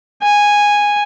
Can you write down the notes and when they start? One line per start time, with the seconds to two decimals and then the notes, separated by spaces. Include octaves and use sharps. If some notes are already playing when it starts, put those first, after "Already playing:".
0.22 G#5